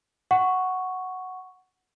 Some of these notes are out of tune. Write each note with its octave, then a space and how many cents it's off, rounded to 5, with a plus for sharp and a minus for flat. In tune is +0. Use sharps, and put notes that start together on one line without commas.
F#5 +0 C#6 +0